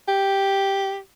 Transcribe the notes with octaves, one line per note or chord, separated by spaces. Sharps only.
G4